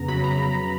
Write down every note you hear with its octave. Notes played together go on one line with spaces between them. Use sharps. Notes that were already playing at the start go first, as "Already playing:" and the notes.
Already playing: F2 C#3 B3 A#5
F#3 B5
A#5
C#3